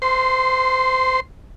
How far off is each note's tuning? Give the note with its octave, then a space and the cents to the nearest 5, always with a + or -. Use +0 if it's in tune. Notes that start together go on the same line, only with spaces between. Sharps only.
C5 -25 C6 +0